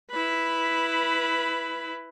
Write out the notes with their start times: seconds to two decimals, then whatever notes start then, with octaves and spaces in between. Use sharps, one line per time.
0.10 E4 B4